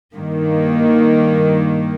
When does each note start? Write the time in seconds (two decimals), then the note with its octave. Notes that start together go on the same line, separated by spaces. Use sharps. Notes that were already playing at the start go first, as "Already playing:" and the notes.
0.15 G2 D#3 A#3